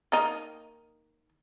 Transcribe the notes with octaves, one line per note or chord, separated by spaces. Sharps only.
D#3 A#3 D#4